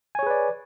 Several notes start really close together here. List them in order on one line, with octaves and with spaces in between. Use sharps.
G#5 C#5 G#4 B4 D5